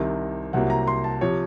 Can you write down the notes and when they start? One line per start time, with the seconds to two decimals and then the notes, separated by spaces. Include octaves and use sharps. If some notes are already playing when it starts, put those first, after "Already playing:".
Already playing: C2 C3 D#3
0.53 C2 C3 F#3 A#3 F#5
0.70 A#5
0.87 C6
1.04 A5
1.21 C3 F3 C#5